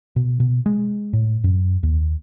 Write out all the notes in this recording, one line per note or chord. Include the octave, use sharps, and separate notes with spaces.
B2
B2
G#3
A2
F#2
D#2